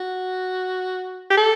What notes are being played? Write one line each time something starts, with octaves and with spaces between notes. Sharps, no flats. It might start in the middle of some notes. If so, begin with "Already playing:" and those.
Already playing: F#4
G4
A4